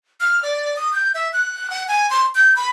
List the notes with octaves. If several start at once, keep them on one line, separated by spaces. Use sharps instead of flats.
F6
D5
D#6
G6
E5
F#6
F#5
G#5
C6
G6
B5